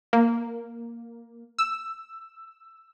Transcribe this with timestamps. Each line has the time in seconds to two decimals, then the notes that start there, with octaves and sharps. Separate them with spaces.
0.13 A#3
1.59 E6